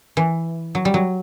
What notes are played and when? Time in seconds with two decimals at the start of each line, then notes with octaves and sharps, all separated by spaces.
0.17 E3
0.75 F#3
0.85 G3
0.94 F#3